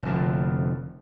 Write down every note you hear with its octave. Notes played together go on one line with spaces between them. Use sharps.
F1 F2 D3